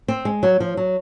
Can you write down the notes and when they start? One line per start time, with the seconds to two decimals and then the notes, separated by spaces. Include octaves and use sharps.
0.08 C4
0.25 G#3
0.43 F#3
0.60 F3
0.77 F#3